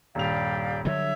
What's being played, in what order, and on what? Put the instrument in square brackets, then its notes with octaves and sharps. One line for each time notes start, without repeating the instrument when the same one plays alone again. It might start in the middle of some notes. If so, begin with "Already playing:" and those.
[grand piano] D#1 G2 F7 [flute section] G4 D5 F5
[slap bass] D3 F#3 G3 [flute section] C#5 E5